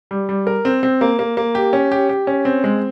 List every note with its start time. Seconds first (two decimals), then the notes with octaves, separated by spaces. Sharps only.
0.11 G3
0.29 G3
0.47 A#4
0.65 C4
0.83 C4
1.01 A#3
1.19 A#3
1.37 A#3
1.55 G4
1.73 C#4
1.92 G4
2.09 G4
2.27 C#4
2.45 C4
2.64 G#3